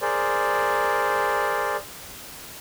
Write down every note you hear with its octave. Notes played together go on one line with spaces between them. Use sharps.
G#4 A#4 C5 D5